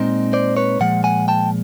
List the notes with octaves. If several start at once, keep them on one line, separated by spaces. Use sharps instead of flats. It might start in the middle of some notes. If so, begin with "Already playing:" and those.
Already playing: A#2 G#3 C4 D#4
C5 D5
B4 C#5
A#2 F3 G#3 F#5
F#5 G#5
G5 A5